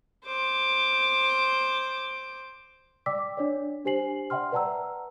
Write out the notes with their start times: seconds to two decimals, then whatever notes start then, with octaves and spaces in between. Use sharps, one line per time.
0.25 C5 D6
3.06 D5 G5 D6 E6 B6
3.37 D4 C#5 D5
3.85 D4 G4 C5 G#5 C7 F#7
4.30 D5 E5 F#5 G5 C6 F6
4.52 B4 D5 F#5 A5 A#5 E6